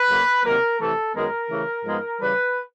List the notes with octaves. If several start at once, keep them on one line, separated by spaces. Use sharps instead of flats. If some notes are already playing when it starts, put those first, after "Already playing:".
Already playing: B4
C#3 F#3 A#3
C3 D#3 F#3 A#3 A#4
C3 E3 A3 A4
F#2 D#3 G#3 B3 A#4
C#3 E3 A3
G#2 F3 G#3 B3
C#3 E3 G3 B4